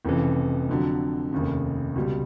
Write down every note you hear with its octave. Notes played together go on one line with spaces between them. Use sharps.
F1 F2 C#3 E3
F2 D3 F#3
F1 D#2 C#3
C#2 B2 G3